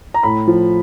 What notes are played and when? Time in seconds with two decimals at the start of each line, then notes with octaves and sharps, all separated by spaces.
0.14 A#5
0.23 A2 B5
0.47 F3